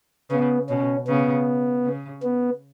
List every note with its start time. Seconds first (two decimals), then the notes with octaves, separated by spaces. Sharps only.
0.30 C#3 B3
0.69 B2 C#4
1.08 C#3 B3
1.85 C#3
2.23 B3